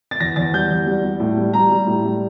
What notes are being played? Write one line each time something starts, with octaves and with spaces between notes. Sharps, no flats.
A6
E2 A#6
E2 A6
G3 G6
E2
G3
G3
A2
G3
G3 A#5
G3
A2
G3